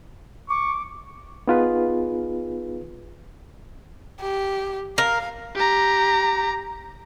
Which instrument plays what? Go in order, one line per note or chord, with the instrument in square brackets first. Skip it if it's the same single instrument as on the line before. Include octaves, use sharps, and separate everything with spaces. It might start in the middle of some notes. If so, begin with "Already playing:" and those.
[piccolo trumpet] C#6 [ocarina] D6
[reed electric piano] B3 D#4 F4 G#4 B4
[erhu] G4
[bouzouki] A#4 [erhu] F5
[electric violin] G4 A#5